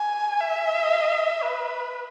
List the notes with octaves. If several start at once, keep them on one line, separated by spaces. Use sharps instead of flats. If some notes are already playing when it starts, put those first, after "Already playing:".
Already playing: G#5
E5
B4